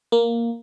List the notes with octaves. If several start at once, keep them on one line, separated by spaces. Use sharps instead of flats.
A#3